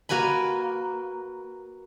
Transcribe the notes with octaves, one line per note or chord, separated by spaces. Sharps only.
A#3 F#4 B4 G#5 B5